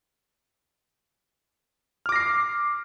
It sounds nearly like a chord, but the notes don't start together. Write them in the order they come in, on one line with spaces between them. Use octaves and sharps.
F6 D6 A#6 C7